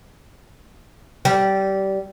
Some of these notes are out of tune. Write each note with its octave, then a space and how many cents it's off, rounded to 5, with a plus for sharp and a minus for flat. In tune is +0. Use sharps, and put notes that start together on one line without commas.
G3 -20